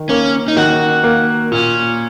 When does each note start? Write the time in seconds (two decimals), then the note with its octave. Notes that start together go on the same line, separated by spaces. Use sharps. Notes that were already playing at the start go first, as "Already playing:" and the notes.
Already playing: D#3
0.09 A#3 C#4
0.48 D#4
0.57 D#3 F#4
1.04 A#3
1.52 A#2 C#4